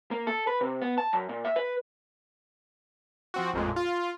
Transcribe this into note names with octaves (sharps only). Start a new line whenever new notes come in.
A#3
A4
B4
C3
B3
A5
F#2
A#2
E5
B4
F3 C4 F#4
A1 F2 A#2 G#3
F4